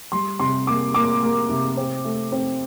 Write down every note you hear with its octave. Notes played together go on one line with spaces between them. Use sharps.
G3 C6
C3 C6
A#3 D6
A#3 D6
A#3
C3
C4
A3
C4